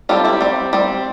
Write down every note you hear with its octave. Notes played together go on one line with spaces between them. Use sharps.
G3 C4 F4 A4
E4 G4
G3 C4
G3 C4